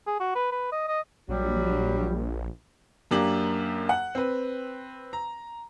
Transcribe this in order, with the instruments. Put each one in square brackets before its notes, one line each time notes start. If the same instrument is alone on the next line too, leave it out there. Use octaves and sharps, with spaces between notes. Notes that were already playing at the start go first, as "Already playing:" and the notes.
[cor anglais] G#4
F#4
B4
B4
D#5
D#5
[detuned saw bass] A#1 [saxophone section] F#3 G3
[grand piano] F#2 A#3 D4 G4 F#7
F#5
C4 B4
A#5